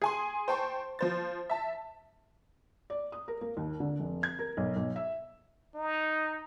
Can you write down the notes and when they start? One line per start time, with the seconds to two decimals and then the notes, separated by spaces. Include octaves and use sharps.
0.02 G#4 G#5 C6
0.48 C5 G5 A5 C6 C#6
0.99 F3 C5 A6
1.50 E5 A5
2.90 D5
3.12 D#6
3.28 A#4
3.41 A#3
3.57 D#2
3.80 D3
4.00 F1
4.23 G#6
4.39 A#4
4.57 B1
4.76 B1
4.96 E5
5.75 D#4